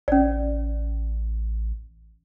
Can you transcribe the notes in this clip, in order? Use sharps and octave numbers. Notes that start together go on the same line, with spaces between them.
A1 C#4 D5